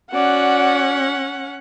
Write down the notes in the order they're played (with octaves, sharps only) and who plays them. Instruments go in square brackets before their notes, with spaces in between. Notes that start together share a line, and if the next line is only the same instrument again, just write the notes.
[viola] C#4 F#5 [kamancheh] F#4 D5